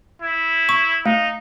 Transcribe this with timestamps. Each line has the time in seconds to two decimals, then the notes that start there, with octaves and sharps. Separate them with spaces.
0.22 E4
0.69 C#6
1.06 A3 D#4